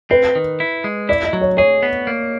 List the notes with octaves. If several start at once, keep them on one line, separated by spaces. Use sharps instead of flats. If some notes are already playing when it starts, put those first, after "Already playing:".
C4 B4
D#3
E4
G#3
E4 D5
D#5
F#3
C#5
G#4 C#5
B3
A#3